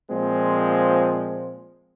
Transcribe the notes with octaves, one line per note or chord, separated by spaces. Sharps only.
A#2 F3 G#3 C4